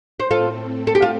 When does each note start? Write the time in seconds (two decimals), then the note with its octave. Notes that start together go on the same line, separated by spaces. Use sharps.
0.20 C5
0.31 A2 A3 C4 F4 A4
0.87 A4
0.95 G4
1.02 F4